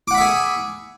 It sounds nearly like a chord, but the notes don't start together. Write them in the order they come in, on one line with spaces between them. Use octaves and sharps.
D6 F#5 B5 E5 G#4